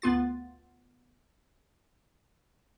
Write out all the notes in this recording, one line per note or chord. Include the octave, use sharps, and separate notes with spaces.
D2 B3 F4 A6